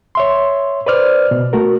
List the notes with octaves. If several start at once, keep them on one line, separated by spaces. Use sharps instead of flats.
C#5 E5 C6
B4 C5 D5 F6
B2
A3 F#4 A#4